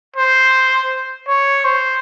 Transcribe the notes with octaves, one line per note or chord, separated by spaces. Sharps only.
C5
C#5
C5